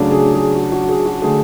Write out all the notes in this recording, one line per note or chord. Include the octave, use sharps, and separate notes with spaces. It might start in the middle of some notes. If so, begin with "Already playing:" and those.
Already playing: C#3 F#3 A3 D4
G#4
G#4
F#4
F#4
G#4
F#4
D3 A3 G#4